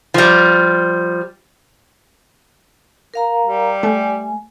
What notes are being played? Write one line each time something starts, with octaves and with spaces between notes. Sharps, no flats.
F3 G3
A#4 F5 A#5
G3
A3 G#5